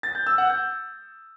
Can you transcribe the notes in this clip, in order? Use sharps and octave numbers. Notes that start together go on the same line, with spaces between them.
A6
G6
E6
F#5
G6